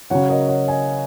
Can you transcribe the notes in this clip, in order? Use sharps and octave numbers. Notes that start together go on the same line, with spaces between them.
C#3 F#3 C#5 F#5
A#4 D#5
C#5 F#5
D#5 G#5